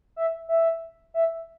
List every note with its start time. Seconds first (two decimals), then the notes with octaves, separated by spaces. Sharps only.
0.16 E5
0.49 E5
1.14 E5